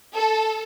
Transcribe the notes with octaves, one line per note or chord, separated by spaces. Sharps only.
A4